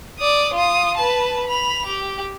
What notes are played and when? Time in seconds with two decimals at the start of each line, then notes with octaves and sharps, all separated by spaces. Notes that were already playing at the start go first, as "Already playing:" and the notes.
0.19 D5 D#6
0.54 F4 D#6
0.98 B4 A5
1.46 B5 F7
1.86 G4